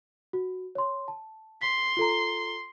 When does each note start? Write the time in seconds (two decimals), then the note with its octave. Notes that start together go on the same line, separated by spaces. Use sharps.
0.33 F#4
0.75 C#5 C6
1.08 A5
1.61 C6 B6
1.97 F4 A4 A#5